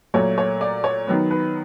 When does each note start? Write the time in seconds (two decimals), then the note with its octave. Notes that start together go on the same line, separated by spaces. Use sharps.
0.14 A#2 F#3 A3 C#5
0.38 C#5
0.61 D5
0.84 C#5
1.07 D#3 F#3 B3
1.31 B4